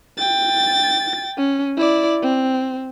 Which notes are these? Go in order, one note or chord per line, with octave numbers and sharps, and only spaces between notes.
G5 A6
C#4
E4 D5
C4